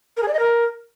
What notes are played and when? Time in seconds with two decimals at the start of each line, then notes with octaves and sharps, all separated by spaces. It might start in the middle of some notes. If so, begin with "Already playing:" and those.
0.17 A#4
0.23 G#4
0.28 D5
0.34 D#5
0.39 A#4